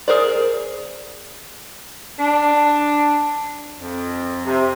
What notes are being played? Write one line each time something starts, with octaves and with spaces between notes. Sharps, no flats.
G#4 A#4 C5 D5
D4
F2
C3